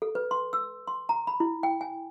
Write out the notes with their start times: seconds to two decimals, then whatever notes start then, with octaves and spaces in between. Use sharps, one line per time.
0.02 A4
0.15 B4
0.31 C6
0.53 E6
0.88 C6
1.09 A#5
1.27 B5
1.40 E4
1.63 G5
1.81 G#5